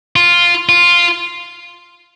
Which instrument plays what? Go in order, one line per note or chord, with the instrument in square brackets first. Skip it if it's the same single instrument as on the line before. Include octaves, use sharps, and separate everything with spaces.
[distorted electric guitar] F4
F4